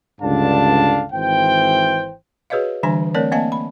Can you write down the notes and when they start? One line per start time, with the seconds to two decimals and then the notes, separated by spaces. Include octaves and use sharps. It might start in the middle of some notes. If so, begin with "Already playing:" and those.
0.21 C#2 G2 D3 D4 F5 A5
1.13 G#1 E3 C5 G5
2.50 F#4 G#4 B4 C#5 D#5 F5
2.83 D3 E3 G3 D4 G#5 C6
3.14 A3 C4 A#4 C#5 D5
3.32 A#3 C4 D#5 F5 G#5 A5
3.52 B5